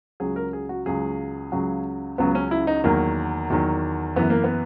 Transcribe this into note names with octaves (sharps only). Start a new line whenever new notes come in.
C#2 C#3 F#3 G#4
A#4
G#4
F#4
C#2 C#3 F#3 G#4
C#2 C#3 F#3
C#2 C#3 F#3 B3
C#4
E4
D#4
E2 D#3 F#3 A#3
E2 D#3 F#3
F#2 E3 B3
A#3
B3